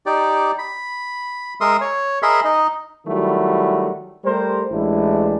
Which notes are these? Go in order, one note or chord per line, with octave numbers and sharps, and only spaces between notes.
D#4 G4 D5
B5
G#3 A#4 E5 C6 D#6
C#5
G#4 A#4 D#5 E5 B5 C6
D#4 D#5
D#3 F#3 G3 A3 E4 F#4
G3 A3 G4 A#4 C5
A1 G#3 D4 E4